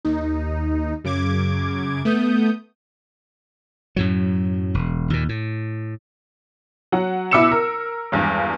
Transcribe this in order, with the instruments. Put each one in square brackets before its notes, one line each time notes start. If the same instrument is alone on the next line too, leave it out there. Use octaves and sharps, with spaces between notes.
[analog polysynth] D#2 D#4
F#2 C#3 D6 G#6
A3 B3 D#6 G6
[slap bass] F#2 A2 F#3
E1
D#2 A#2
A2
[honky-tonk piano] F#3 F#5
B2 E4 D6 E6 C#7 E7
A#4
G#1 E2 G2